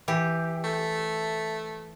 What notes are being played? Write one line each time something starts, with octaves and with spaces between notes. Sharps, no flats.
E3 G4
A3